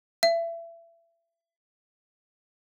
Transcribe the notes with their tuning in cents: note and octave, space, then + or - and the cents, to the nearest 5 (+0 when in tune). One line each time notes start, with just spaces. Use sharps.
E5 +30